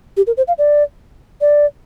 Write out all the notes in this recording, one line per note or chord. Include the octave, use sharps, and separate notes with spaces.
G4
A#4
C5
F5
D5
D5